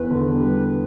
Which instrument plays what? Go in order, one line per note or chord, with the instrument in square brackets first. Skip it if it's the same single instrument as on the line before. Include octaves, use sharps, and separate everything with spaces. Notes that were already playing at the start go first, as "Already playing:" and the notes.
Already playing: [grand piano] E2 B3 [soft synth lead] B4
[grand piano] D3
G3